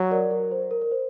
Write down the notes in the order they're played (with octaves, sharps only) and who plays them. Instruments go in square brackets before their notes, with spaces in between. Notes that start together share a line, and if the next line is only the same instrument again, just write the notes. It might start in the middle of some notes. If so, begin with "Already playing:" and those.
Already playing: [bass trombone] F#3
[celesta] A#4 D5
A#4
C5
A#4
A#4
C5